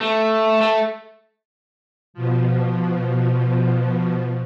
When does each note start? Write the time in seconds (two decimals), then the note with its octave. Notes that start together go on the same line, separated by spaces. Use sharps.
0.01 A3
0.61 A3
2.14 B2 F3